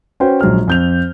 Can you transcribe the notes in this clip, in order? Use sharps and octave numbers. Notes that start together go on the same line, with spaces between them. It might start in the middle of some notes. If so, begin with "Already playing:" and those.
C#4 F#4 B4 C5 G5
A#1 F#3 G#3 F6
F2 G6 F7